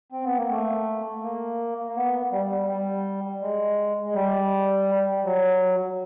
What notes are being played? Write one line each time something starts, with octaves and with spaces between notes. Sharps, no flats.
C4
B3
A#3
A3
A#3
A#3
B3
G3
G3
G#3
G#3
G3
F#3